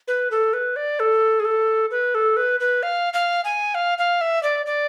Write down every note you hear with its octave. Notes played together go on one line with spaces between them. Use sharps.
B4
A4
B4
D5
A4
G#4
A4
B4
A4
B4
B4
F5
F5
G#5
F5
F5
E5
D5
D5